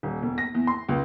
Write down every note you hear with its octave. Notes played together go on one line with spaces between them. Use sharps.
D#1
E1
A#6
E2
C6
C#2